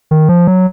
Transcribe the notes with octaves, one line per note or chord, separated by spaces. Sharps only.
D#3
F3
F#3